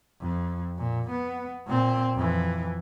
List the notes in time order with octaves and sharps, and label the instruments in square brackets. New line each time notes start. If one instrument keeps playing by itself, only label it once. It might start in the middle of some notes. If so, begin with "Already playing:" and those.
[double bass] F2
A#2
B3
A#2 C4
F2 E3